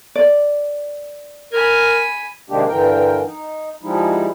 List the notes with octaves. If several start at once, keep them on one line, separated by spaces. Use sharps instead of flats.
D5
A#4 G#5 B5
C3 D#3 G#3 A#3 D4 G4
G2 D3 E3 A#4 G5
D#4
F3 G3 G#3 D#4 E4